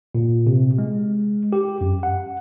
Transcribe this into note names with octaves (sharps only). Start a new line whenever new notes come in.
A#2
C3
G#3
G4
F#2
F#5